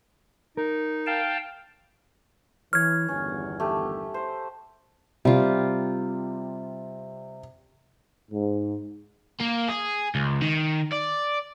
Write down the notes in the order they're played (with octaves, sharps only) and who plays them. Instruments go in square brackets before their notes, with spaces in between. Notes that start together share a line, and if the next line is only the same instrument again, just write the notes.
[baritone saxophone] D#4 [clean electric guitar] A#4
[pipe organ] F5 G5 A5
[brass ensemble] E3 [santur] C#5 [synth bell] F6 G#6
[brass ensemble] G1 E2 D#3 [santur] C#4
[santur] A3 G4
C5
[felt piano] C3 [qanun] G3 F4
[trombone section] G#2
[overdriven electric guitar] A#3
G#4
C#2
D#3
D5